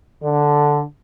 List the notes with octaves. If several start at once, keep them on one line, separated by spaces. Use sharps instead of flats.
D3